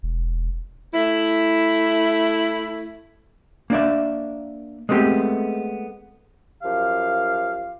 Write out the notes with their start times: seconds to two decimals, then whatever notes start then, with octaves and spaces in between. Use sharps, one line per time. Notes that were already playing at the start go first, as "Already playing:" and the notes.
0.03 E1
0.93 A3 E4
3.70 A#3 D4 D5 E5
4.89 G#3 A3 B3 C4 G4
6.63 F#2 F3 G4 F5